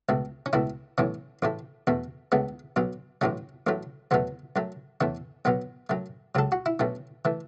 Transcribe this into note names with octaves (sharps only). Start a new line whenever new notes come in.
C#2 B2 A3
C#4
C#2 B2 A3 E4
B1 A2 E3 C#4
A1 A2 A3
E2 B2 A3
C#2 C#3 A3 B3
B1 B2 F#3
A1 A2 F#3 A3 C#4
A1 A2 F#3 A3
E2 B2 F#3 A3 B3
F#2 F#3 A3
E2 E3 A3 C#4
B1 B2 F#3 B3
F#2 F#3 A3
C#2 C#3 F#3 A4
F#4
E4
B1 B2 A3 C#4
E3 A3